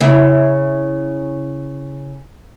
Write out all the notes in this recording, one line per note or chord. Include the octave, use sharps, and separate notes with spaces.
C#3 E4